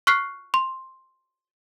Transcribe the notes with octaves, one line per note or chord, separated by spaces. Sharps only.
C#6 F6 F#6 B6 C7
C6